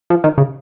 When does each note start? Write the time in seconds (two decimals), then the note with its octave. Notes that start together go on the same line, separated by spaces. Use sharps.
0.10 F3
0.24 D#3
0.38 C#3